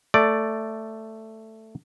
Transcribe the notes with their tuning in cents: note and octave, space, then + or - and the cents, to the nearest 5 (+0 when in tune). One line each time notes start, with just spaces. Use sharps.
A3 +5 D5 +0